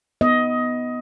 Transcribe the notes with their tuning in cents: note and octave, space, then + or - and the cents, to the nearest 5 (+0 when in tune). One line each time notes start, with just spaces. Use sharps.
B3 +0 D#5 +15